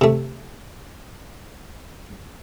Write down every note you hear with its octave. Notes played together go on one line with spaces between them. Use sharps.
C3 A3